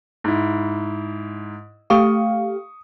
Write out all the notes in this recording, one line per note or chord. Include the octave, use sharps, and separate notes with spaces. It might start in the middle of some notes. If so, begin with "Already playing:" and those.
G#2 E4
A3 G4 F5 C#6 D#6